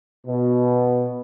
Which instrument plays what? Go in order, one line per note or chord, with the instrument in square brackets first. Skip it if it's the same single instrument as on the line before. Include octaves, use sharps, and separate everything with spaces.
[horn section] B2